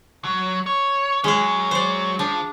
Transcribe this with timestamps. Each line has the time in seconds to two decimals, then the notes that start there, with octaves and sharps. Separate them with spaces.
0.24 F#3
0.66 C#5
1.24 F#3 G#3 C#4 G#4
1.71 C5 D5
2.19 F3 D4